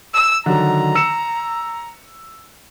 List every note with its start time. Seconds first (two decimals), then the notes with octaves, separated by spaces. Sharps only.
0.14 E6
0.46 D3 D#3 F#3 A#5
0.95 E6 C#7 E7